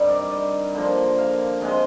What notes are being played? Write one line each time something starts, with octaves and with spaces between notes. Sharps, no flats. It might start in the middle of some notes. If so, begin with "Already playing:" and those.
Already playing: G2 C3 D#3 G3 A#4 C5
D5
D#5
D3 F3 A#3
F5
C3 D#3 G#3 D#5